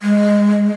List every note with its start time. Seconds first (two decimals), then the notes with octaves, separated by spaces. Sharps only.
0.03 G#3